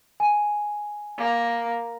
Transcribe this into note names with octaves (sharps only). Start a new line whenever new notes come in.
G#5
A#3